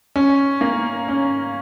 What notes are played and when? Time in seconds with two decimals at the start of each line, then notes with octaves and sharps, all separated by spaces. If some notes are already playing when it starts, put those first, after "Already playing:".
0.16 C#4
0.61 A#3
1.08 C#4